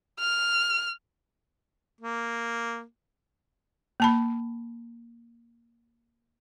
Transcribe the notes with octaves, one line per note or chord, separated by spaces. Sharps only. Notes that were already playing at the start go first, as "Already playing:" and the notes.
F6
A#3
A#3 A5 B5